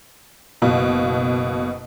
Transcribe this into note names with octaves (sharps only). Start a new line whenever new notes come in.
F#1 B2 F5